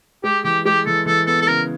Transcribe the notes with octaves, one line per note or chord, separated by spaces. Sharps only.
G#3 G4
E3 G4
G#3 G4
E3 A4
E3 A4
B3 A4
A4
C#3 A#4